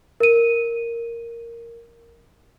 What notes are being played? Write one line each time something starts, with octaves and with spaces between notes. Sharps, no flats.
A#4 D#7